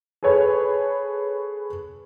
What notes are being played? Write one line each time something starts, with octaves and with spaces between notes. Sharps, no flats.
G#4 A4 B4 C#5